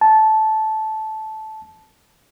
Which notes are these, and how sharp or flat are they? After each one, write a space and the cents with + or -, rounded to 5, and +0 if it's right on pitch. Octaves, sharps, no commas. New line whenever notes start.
A5 -15